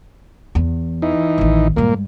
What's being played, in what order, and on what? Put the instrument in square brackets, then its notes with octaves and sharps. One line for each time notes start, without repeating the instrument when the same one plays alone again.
[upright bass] E2
[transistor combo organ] E3 D#4
[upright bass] A1 D#3
[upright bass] G2 G#3 [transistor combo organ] A#2 A#3